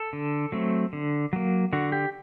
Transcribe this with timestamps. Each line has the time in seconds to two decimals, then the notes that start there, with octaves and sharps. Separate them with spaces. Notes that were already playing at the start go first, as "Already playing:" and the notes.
Already playing: A4
0.13 D3
0.52 F#3 A3 C4
0.93 D3
1.33 F#3 A#3
1.73 D3 F#4
1.92 G4